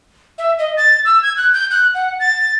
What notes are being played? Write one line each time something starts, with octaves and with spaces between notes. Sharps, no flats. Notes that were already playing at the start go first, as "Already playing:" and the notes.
E5
D#5
A6
E6
G#6
F#6
G6
F#6
F#5
A6